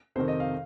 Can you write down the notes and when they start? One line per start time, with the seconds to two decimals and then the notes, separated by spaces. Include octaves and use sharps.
0.16 F2 C3 D#3 C5
0.28 D#5
0.40 F5